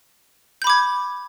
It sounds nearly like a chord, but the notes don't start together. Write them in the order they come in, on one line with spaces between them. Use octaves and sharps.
G6 B5 D6 G#6